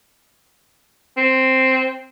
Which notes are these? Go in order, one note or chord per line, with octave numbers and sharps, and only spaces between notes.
C4